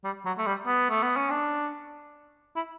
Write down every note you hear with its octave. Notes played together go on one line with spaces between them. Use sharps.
G3
F#3
A3
G3
B3
A3
B3
C#4
D4
E4